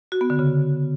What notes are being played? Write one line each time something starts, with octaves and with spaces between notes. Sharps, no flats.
F#4
B3
D3
C#3